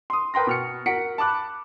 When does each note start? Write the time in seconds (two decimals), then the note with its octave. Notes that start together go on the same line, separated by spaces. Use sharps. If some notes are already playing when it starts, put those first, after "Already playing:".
0.10 C6 D#6
0.34 A#4 B4 G5 C6 A#6
0.47 B2 F6 C#7
0.86 F#4 A#4 F#5 B6 C#7 D7
1.18 A5 B5 D6 F#6